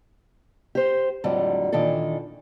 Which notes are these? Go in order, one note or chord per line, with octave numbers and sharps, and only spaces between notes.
G4 C5
F2 A2 D3 F#3 G3
A#2 D#3 E3 D4 A4